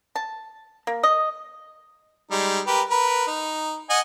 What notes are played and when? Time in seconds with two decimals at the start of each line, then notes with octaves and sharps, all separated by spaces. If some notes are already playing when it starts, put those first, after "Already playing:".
0.16 A5
0.87 A#3
1.03 D#5
2.31 G3 G#3 D#4
2.67 G4 A#4 B4
2.90 A#4 B4
3.27 D#4
3.90 D#5 F#5 G#5